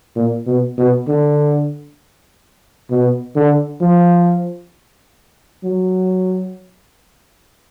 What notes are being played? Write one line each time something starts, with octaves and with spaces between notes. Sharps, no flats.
A#2
B2
B2
D3
B2
D3
F3
F#3